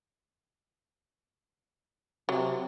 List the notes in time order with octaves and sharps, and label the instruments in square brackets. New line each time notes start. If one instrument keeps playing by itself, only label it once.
[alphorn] C3 [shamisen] F#3